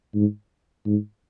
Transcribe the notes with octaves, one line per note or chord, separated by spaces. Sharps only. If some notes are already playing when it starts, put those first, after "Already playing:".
G#2
G#2